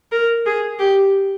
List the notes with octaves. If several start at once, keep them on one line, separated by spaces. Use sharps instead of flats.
A#4
G#4
G4